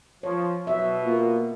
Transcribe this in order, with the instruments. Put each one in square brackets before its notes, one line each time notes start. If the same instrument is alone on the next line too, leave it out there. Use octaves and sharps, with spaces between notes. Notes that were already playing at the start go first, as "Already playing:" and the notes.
[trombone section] F3 [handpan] C#5
[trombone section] B2 [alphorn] F#3 [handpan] E5
[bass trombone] A#3 [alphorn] F4